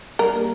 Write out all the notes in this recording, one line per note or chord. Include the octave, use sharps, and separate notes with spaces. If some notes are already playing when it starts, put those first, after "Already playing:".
G3 A#4
A#3